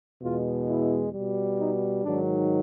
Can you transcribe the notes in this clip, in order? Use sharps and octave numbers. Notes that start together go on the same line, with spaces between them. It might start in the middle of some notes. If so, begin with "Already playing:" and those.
E2 B2 G#3 F4
E4
B2 G3
D#4
G#2 D#3 F#3 D4